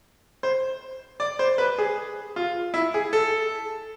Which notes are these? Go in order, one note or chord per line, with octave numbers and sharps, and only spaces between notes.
C5
D5
C5
B4
G#4
F4
E4
G#4
A4